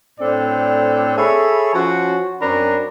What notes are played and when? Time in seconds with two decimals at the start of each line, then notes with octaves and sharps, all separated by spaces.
0.19 A2 C4 D4 A4 D5
1.17 G#4 A4 C#5 E5 B5
1.74 F3 C#4 F#4
2.41 F#2 C4 D4 A#5 B5